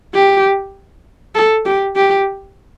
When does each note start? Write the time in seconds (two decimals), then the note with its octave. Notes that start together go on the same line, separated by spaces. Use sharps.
0.14 G4
1.35 A4
1.65 G4
1.96 G4